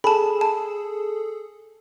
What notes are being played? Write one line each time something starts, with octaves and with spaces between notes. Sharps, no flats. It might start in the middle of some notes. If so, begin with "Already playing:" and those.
G#4 A4 A5 B5
A5